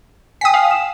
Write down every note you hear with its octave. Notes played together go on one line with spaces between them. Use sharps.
G5 G#5 D#6 B6
F5
E7